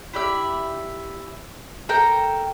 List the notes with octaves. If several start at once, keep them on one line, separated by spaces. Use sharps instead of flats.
E4 G4 D5 E5
A4 A#4 G5 A#5